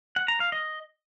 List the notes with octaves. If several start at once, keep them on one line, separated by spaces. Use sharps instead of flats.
F#5
A#5
F5
D#5